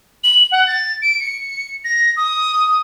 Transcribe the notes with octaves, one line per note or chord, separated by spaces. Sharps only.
F#7
F#5
A6
D7
C#7
A#6
D#6